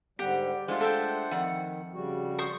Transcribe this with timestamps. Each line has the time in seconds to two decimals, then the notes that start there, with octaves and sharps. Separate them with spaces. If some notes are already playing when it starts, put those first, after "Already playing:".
0.19 G#2 D3 G3 G4 F#5
0.68 G#3 A3 D4 F4 C5 F#5
0.81 A4 E5 G5
1.31 F2 D#3 F#5
1.94 C#3 G3 F#4
2.38 C5 C#6 D#6